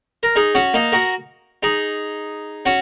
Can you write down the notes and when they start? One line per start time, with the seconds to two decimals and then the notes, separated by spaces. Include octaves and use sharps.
0.23 A#4
0.36 D#4 G#4
0.55 C#4 F#4
0.74 A#3 D#4
0.92 F#4 A#4
1.63 D#4 G#4
2.66 C#4 F#4